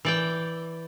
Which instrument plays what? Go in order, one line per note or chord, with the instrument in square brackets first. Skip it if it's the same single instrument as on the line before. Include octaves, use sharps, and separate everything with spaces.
[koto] E3 D5 G5